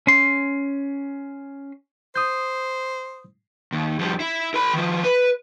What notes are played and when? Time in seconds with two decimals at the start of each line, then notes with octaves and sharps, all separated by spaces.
0.07 C#4 C6
2.16 C5 D#6 G6
3.72 D#2
3.99 F2 G3
4.20 E4
4.54 A#4 B5
4.73 D#3 F3
5.04 B4